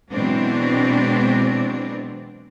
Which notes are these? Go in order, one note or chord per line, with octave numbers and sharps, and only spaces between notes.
B2 E3 F#3 G#3 C4 D4